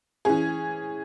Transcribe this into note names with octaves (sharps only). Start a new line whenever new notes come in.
E3 C#4 G#4